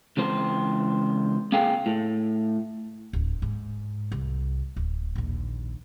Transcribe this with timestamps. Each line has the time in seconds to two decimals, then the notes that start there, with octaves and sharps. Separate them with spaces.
0.17 C#2 E3 C4 C5
1.52 A#3 C4 G#4 F5 G5 G#5
1.86 A2
3.13 D1
3.42 G#2
4.12 C2
4.76 D1
5.15 A#1 D#2